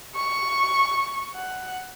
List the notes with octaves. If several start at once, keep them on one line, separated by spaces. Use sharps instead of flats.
C#6
F#5